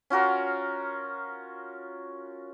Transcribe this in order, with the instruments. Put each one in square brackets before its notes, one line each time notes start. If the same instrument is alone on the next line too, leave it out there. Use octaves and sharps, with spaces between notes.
[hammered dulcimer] C#4 F4 F#4 A#4